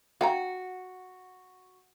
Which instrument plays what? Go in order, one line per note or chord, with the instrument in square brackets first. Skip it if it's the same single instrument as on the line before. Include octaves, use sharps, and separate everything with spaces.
[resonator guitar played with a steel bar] F#4 [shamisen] F5 G5 A#5